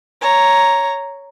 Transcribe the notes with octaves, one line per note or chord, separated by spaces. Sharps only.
C#5 A#5